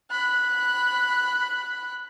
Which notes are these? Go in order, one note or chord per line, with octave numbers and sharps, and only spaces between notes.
B5 F#6